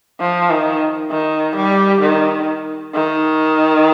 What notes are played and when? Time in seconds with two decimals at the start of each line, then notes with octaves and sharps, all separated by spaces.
0.20 F3
0.50 D#3
1.10 D#3
1.56 G3
2.01 D#3
2.94 D#3